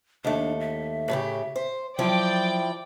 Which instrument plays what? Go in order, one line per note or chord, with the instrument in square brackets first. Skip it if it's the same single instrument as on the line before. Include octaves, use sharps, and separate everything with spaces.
[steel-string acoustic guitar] D#2 A3 [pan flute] D4
[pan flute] E5
[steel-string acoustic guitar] A2 C#3 G4
C5
[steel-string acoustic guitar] F3 E4 [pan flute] F#3 [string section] D5 G5 D6